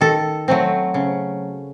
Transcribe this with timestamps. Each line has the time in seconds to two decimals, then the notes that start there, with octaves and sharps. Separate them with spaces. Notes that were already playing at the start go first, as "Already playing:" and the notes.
0.01 D#3 A4
0.48 F#3 A3 C4
0.94 C#3